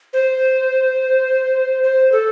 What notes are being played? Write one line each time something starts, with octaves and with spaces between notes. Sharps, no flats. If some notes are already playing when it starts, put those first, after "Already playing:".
C5
C5
A4